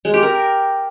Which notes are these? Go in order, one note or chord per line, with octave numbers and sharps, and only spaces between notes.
G#3
G4
A#4